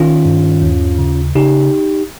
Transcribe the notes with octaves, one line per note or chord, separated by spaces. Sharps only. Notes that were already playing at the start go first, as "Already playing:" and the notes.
Already playing: D#3 C#4 F4
G2
D#2
C#3
C#3 D#4 G4